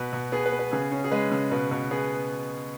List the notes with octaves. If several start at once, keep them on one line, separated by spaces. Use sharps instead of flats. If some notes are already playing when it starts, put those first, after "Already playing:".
Already playing: B2 B4
B2
B3 G#4
B4
B3
B4
C#3 G#4
C#4
G#4
G#3 B4
C#3
B2 B4
B2
B3 G#4